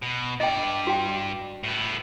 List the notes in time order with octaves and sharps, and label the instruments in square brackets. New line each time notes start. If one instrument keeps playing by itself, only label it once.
[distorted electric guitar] B2
[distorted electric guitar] G2 D5 [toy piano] D#5 G5
[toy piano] F#4 G5
[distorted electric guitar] A2 B3